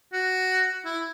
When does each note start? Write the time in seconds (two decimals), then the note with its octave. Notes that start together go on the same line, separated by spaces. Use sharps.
0.13 F#4
0.85 E4